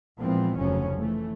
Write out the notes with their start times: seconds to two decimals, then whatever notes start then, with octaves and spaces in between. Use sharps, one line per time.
0.19 A#2 E3 F3 G#3 B3 C4
0.57 F1 D2 C#3 F3 F#3 C#4
0.97 E3 A3